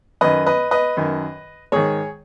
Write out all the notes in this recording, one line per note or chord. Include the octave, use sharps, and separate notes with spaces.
F#2 D#3 B4 D#5
B4 D#5
B4 D#5
F#2 D#3
G#2 D#3 G#4 C#5